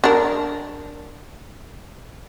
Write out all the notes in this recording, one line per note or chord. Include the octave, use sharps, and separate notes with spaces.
D4 A#4